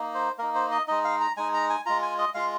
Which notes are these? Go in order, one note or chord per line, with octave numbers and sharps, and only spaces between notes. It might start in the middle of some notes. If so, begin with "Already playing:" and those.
Already playing: A#3 D#4
C5
A#3 D#4 A#4
C5
D#5
G#3 D#4 D#5
F5
A#5
G#3 D#4 G#5
A#5
G#5
G#3 F4 A#5
G#5
D#5
G#3 F4 F5